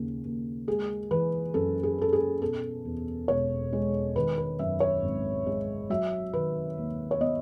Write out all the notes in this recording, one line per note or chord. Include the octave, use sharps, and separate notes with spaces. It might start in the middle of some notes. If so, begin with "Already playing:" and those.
Already playing: D#2 C#3
D#2
G#3 G#4
E3 B4
F#2 A4
G#4
C#4 A4
G#4
B2 A4
E2
E1 C#5
G#3
D#3 B4
B4
F#2 E5
C#5
G#1
G#3
F#3 E5
D#3 B4
D#2
C#5
B3 D#5